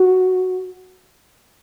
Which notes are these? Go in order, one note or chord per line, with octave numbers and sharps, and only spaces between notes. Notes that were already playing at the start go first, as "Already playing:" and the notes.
Already playing: F#4